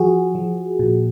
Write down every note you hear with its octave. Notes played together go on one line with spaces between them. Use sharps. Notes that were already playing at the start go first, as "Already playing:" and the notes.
Already playing: F3 F#4 G#4
F3
A#2